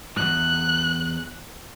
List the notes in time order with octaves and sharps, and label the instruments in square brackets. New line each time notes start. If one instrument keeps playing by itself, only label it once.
[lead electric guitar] E2 G2 [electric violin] F#6